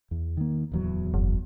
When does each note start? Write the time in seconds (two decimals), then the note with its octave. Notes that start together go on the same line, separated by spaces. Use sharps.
0.11 E2
0.37 D#3 A#3
0.72 D1 E2 F#3
1.14 F#1